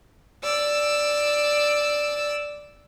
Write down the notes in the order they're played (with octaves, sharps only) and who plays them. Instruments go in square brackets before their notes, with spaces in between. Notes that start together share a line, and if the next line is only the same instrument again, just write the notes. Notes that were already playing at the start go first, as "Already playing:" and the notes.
[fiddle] D5 E6